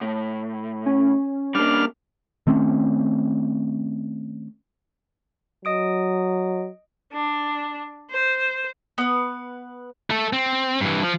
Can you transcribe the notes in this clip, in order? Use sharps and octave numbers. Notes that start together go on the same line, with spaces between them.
A2
C#4
G3 A#3 D4 F6
D#3 A3 C4 C#4
F#3 D#5 D#6 D7
D4
C5
B3 B4
A3 A4
C4
G2 E3
F3